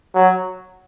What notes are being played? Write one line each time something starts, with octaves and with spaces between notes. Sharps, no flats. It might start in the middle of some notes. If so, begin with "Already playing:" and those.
F#3